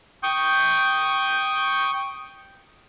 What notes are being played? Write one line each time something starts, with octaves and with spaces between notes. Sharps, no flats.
G5 C#6 D#6 G6